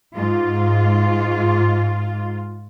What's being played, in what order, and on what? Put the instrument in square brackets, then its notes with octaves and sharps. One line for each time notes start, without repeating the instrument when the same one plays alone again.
[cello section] G#2 F4